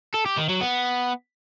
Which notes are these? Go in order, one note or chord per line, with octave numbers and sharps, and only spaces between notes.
A4
G4
D#3
F#3
B3